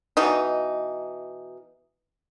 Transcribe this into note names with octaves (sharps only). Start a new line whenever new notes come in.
B2 E3 D#4